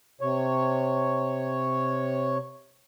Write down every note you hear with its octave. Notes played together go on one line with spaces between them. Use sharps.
C3 C#5